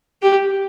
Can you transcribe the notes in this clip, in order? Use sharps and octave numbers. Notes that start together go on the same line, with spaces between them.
G4